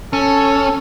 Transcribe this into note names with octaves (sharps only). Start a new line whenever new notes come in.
C#4 A4